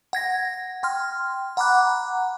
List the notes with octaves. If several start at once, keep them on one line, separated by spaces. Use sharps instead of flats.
F#5 G#6 A#6
G5 C6 F6
F#5 A#5 B5 D6 F#6